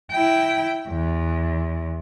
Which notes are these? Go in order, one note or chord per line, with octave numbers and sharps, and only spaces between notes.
E4 G5
E2